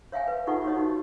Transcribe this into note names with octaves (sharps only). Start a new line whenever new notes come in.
C#5 E5 F5 G5 G#5
B4
D#4 F4 G4 A4 F#5 C#6
D#4 F#4 C#5 D#5
D#4 F#4 G4